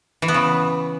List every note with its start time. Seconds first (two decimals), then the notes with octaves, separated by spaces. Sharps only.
0.22 E3
0.28 B3
0.34 C#3